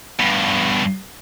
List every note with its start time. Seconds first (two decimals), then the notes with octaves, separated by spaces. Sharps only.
0.19 G2 B2